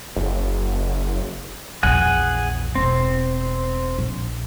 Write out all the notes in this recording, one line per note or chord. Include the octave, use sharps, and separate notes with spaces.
F#1
A#1 E2 G#4 F#5 G#5
E1 C4
A#1